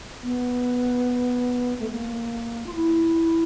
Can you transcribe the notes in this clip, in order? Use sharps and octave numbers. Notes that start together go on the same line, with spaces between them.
B3
A3
A#3
F4
E4